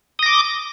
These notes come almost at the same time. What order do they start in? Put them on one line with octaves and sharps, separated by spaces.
D#6 A#6 D6